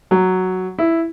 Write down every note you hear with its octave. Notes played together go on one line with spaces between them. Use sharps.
F#3
E4